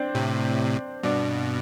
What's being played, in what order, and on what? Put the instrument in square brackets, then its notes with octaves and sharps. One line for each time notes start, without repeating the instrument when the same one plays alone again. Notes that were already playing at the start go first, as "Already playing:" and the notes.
Already playing: [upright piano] C4 D4
[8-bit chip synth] A2 C3
[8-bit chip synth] G2 B2 [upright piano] D4